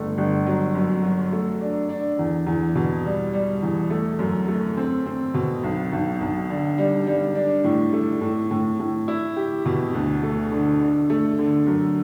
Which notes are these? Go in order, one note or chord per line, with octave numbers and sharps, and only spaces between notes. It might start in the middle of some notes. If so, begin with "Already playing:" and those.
Already playing: G1 A3
G1
F#3
F#2
F#3
A3
D4
D4
E2
E2
B2
G3
G3
E2
A3
F#2
A3
C4
C4
B2
B1
B1
B1
D3
G3
G3
D4
A2
A3
A2
A2
A2
E4
G4
B2
D2
A3
D3
D3
A3
D3
F#2